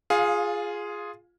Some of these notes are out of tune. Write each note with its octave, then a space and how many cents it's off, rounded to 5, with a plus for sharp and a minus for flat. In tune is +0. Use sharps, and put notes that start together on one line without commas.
F4 +0 G#4 +0 F5 +25